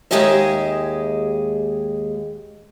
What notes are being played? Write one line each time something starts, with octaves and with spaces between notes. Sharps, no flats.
D#2 G#3 G4 G#4 D#5 E5